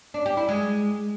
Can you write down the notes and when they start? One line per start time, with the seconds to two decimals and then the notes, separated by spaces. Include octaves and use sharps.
0.14 D4
0.26 G4
0.37 E4
0.48 G#3